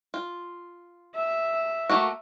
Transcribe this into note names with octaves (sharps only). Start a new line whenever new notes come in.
F4
E5
A3 A#3 F#4